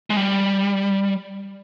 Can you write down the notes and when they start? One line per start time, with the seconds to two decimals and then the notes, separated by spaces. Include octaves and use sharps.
0.10 G#3
0.17 G3